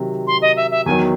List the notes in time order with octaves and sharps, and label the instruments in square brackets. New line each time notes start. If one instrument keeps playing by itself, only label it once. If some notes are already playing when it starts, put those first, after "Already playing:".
Already playing: [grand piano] C3 D#3 F#3
[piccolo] C6
D#5
E5
E5
[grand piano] E2 D#3 F#3 [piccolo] G#5